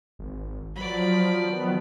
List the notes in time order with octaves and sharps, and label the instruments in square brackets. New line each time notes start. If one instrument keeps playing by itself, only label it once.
[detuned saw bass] G#1
[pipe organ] F3 [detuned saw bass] F#3 [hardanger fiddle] D5 B5
[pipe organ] D#3 F3 B3